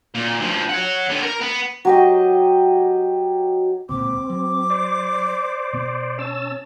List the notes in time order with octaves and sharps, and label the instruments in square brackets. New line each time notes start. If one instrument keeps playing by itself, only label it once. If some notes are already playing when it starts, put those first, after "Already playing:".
[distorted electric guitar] A#2
G2 F3
C#5 F#5
D3 B3
A#4
B3
[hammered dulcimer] F#3 G4 D#5
[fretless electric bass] D1 C#2 A#2 [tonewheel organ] C4 [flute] D6
[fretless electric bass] F#3
[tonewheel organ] C5 D5
[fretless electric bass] B2 B3
[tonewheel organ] C#4 A5 E6